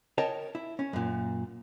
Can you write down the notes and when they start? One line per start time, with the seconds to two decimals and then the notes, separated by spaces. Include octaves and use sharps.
0.18 A#4 C#5 D#5 G5 A5
0.55 E4
0.79 C#4
0.93 F#2 A#2